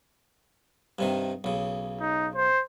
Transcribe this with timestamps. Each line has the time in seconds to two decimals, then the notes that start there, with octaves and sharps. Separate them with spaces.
0.99 G2 C3 D#3
1.44 B1 C#3
2.00 D#4
2.36 C5